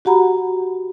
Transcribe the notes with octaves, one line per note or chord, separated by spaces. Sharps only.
F#4 G4 F#5 A#5 B5